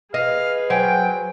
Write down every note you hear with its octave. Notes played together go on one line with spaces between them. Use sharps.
G#4 B4 D#5 F5
F#3 C5 G5 G#5